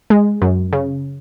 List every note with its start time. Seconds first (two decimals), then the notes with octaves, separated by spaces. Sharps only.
0.10 G#3
0.42 F#2
0.73 C#3